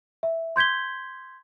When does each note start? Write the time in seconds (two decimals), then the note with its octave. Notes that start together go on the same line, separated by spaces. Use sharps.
0.23 E5
0.56 C6 G6 G#6 B6 G7